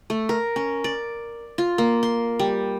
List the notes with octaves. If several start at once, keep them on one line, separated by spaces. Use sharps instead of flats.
A3
A#4
C#4
D5
F4
A#3
C6
G3